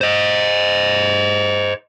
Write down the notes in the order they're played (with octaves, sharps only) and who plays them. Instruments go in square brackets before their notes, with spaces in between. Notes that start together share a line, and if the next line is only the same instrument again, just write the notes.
[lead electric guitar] C5 D#5